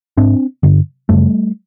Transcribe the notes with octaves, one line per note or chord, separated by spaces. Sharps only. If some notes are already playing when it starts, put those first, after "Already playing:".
G#2 C4 D4
G2 D3
F#2 C#3 G3 A3